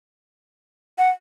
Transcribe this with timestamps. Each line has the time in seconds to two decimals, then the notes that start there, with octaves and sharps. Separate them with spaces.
0.98 F#5